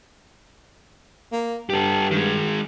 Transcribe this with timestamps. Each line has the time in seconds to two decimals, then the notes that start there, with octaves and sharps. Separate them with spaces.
1.32 A#3
1.70 G2 G4 A4
2.11 D#3 G#3